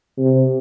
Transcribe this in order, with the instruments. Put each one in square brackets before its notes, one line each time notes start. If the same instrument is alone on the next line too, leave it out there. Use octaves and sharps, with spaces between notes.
[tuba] C3